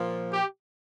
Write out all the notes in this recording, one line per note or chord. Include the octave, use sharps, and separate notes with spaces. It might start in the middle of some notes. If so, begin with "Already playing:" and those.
Already playing: A#2 F3
G4